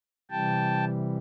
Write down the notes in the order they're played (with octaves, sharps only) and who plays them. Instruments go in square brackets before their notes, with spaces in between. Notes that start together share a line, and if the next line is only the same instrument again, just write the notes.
[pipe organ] C3 E3 G3 G5 A5